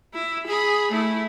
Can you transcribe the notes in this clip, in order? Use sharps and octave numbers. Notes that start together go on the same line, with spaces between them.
E4
G#4 B5
A3 E4